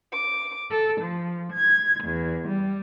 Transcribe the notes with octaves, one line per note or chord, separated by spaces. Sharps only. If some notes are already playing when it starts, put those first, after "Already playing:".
D6
A4
F3
G#6
E2
G3